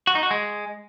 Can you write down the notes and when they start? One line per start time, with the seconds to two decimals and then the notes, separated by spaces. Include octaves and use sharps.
0.07 F#4
0.15 D#4
0.23 F#4
0.31 G#3